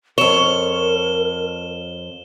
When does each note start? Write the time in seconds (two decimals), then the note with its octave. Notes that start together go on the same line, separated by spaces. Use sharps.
0.18 F2 A#4 C#5 E7 G7